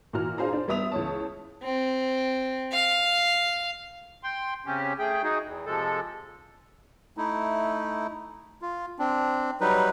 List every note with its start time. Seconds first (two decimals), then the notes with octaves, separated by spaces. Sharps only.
0.13 A#2 E3 F#4 A#5 F6
0.38 D4 F4 G#4 C5 F5 A#5
0.53 D4 C5
0.68 G3 B3 E5 D#6 F7
0.92 C#2 E3 C#5 A5
1.64 C4
2.73 F5
4.23 G5 C6
4.66 C#3 C4 C#4 G4
4.99 A3 G#4 G5
5.23 D#4 F#4 G#4
5.43 E2
5.66 C3 F3 G#3 A4
7.17 A3 D#4 E4
8.62 F4
8.99 C4 D4
9.61 F#3 G3 D#4 B4